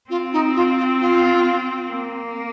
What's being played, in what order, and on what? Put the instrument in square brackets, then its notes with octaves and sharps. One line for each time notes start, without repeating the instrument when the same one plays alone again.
[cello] C4 [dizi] F4
[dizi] D#4
F4
F4
F4
[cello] A#3